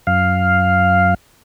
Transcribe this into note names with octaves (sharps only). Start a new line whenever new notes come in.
F#2 F5